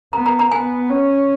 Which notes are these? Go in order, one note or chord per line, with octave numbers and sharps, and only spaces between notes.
B3 A#5
A#5
A#5
B3 G#5
C#4